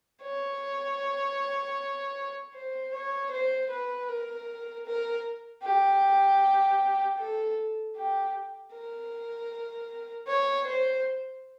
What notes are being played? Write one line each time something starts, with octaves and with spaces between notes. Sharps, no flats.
C#5
C5
C#5
C5
B4
A#4
A#4
G4
A4
G4
A#4
C#5
C5